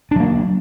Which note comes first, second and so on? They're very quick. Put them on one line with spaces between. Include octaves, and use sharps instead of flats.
D4 F#3 A#3